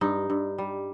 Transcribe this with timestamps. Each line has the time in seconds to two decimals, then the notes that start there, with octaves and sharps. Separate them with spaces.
0.01 G2 D#4
0.30 G2
0.58 G3